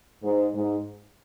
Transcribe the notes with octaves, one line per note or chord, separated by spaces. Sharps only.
G#2
G#2